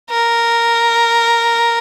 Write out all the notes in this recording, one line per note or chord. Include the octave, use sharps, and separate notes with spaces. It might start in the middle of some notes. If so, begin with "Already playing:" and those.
A#4